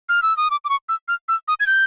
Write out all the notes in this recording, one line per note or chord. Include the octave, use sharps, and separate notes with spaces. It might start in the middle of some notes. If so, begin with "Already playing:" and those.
F6
E6
D#6
D6
D6
C#6
E6
F6
E6
D#6
G#6
G6